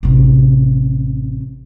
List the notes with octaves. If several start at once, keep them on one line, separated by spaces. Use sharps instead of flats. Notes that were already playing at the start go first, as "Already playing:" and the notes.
A1 C3